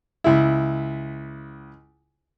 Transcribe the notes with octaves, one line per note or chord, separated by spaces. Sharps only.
C#2 E4